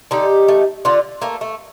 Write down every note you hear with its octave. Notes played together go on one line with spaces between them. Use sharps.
D3 D#4 G4
A3
D3 D4 F4
A3 A#3
A3